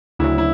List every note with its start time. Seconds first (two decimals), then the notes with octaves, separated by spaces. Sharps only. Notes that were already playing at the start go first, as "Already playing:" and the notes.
0.19 D2 C#3 F#3 E4
0.38 E4